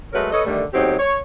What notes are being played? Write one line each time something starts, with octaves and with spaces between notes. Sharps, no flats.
F#3 G#3 A3 A#4 B4 C#5
A4 B4 C#5 D#5
D3 D#3 G3 A3
E2 A2 F#3 C4 D#4 G4
C#5